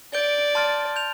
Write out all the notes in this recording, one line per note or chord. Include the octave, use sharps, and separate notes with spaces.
D5 G6 D7 G7
A5 C6 F6 A6
G6 F7